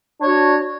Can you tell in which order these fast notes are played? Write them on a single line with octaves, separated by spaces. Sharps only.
D4 C#5 F#4